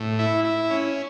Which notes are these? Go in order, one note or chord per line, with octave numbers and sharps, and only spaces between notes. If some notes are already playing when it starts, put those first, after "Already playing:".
Already playing: A2
E4
E4
C#4